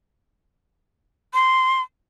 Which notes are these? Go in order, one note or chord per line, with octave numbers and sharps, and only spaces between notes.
C6